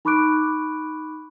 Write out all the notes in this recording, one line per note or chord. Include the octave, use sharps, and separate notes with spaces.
D#4 B5 C#6 D6 F#6 D7